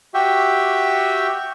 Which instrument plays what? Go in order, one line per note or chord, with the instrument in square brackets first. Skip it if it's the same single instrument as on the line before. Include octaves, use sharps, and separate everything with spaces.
[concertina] F#4 G4 E5 G5